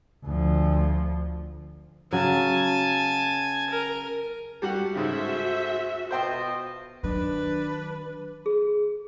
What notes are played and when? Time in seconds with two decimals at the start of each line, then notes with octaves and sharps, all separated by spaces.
0.25 D2 F3
2.12 C#3 F#3 G#5 A5
3.71 A#4
4.62 G3 F#4 F#5
4.95 G#2 C#3 F#4 G#4 A4 C5 E5
6.11 B2 F4 C5 D#5 G5 C6
7.04 D#3 F#3 D4 B4
8.46 G#4